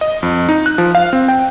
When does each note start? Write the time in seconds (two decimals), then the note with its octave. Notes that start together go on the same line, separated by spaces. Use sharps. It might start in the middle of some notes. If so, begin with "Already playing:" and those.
0.01 D#5
0.23 F2
0.49 D#4
0.66 F#6
0.78 F3
0.95 F5
1.13 C4
1.28 G5